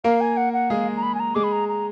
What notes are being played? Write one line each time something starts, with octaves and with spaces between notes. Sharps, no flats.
A#3 A#4 F5
G#5
F#5
F#5
G#3 G#4 F5
A#5
B5
G#5
A#5
G#3 G#4 D6
B5
A#5
A#5